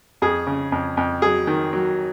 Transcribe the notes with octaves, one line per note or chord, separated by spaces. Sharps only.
F2 G#4
C#3
F2
F2
F#3 G#4
D#3
F#3